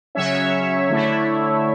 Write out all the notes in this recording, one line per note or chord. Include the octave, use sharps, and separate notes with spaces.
C#3 F#3 C#4 C#5 E5
D3 A3 E4